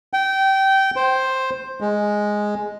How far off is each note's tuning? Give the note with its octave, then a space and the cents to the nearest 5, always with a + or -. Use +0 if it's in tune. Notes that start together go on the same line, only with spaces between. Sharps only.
G5 -20
C5 +5
G#3 +0